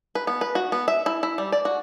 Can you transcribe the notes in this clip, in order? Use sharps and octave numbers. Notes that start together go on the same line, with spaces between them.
B4
B3
B4
F#4
B3
E5
E4
E4
G3
D5
F#4